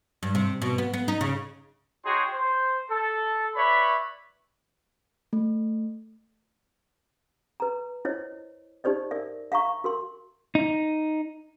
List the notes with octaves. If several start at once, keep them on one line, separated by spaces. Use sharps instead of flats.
G2
C3
B2
B3
B3
D#4
C#3
D#4 F#4 G#4 C#5 G5 C6
C5
A4
B4 C#5 D5 E5 B5
A3
B4 A#5
E4 C5 C#5 D#5
D#4 G4 C5 D5 D#5
A#4 D5 E5
E5 F5 A#5 C#6
F#4 A#4 C6
D#4